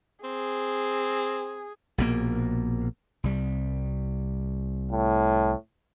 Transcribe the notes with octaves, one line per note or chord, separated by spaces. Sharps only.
C4 G#4
A#1 B2 A#3
C2 G3
A2